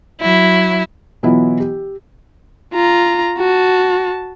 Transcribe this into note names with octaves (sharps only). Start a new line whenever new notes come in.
F#3 E4
B2 E3 F#3 B3 E4 F4
G4
F4 A#5
F#4 A5